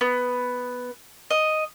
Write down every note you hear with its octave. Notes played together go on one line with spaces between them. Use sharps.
B3
D#5